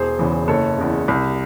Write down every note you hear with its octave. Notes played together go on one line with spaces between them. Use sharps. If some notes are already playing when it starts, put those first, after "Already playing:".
Already playing: E1 G#4 C5
E2 C#3 E3
F#1 A4 C#5
E2 C#3
C2